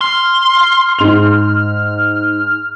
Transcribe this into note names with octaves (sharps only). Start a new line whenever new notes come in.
C6 F6
G#2 F7